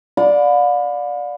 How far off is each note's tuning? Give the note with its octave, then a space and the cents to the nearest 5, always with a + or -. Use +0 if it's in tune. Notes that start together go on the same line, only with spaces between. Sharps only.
D5 +0 F5 +45 B5 +20